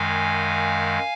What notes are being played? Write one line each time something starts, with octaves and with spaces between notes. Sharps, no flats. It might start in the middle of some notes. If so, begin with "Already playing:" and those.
Already playing: F#2 D#3 G#3 F5 G#5